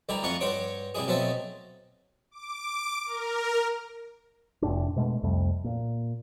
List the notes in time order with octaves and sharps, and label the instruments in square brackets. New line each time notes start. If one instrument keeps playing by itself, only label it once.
[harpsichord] D2 G3 E4 G4 A#5
F2 A3 F4 F#5 C#6
G2 F#4 C5 C#5 D6
C3 G3 E4 G#4
B2 F#3 A3 C4 E5 A5
[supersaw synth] D6
A#4
[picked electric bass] F1 A2 D4
B2 G#3 A3
C2 F2 G3 A3
A#2